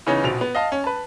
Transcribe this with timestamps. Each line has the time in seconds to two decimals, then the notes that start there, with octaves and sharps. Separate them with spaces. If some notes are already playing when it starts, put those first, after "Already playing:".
0.06 C#3 E3 B3 C#4 D#4
0.24 A#1 B2 F3 F7
0.41 B3
0.55 D#5 F5 A5
0.72 C#4
0.84 B4 A5